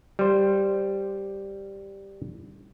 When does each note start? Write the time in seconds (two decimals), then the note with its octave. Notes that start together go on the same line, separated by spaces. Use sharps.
0.19 G3 C5